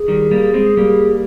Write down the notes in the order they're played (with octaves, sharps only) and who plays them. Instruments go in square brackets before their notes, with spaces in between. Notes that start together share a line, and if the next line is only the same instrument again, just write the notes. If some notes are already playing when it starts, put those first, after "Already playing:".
Already playing: [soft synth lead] G#4
[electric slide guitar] D#3 G3
G3 A#3
G#3 C4
G3 A#3